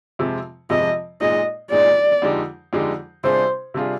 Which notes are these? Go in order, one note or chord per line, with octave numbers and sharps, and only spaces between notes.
F2 C3 F3 G#3
F2 C3 F3 G#3 D#5
A#2 G#3 D#4 D#5
A#2 G#3 D#4 D5
F2 D3 G#3 D#4 G4
F2 D3 G#3 D#4 G4
C3 G3 D4 F4 G#4 C5
C3 G3 D4 F4 G#4